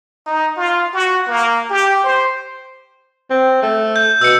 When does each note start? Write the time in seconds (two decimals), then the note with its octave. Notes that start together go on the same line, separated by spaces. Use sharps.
0.27 D#4
0.57 F4
0.93 F#4
1.27 A#3
1.70 G4
2.04 C5
3.30 C4
3.62 A3
3.96 G6
4.21 B2 E6 C#7